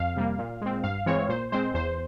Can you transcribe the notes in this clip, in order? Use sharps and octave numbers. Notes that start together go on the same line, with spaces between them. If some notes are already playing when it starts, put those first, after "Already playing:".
Already playing: F2 F5
C3 G3 A#3
A#2
G#3 C4
G2 F5
E3 G#3 C4 C#5
A#2 C5
G#3 C4 C5
E2 C5